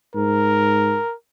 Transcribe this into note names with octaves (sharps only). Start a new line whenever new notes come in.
G#2 A#4